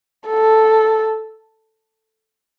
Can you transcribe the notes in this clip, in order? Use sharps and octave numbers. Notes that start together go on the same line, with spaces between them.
A4